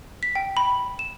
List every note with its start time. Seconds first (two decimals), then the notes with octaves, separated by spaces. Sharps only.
0.23 B6
0.35 G5
0.57 B5
0.99 E7